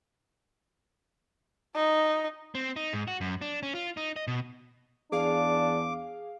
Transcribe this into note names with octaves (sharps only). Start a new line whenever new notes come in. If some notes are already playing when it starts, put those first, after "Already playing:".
D#4
C4
D#4
G#2
F#4
F#2
D4
C#4
F4
D#4
D#5
B2
E2 D4 G#4 F5 D6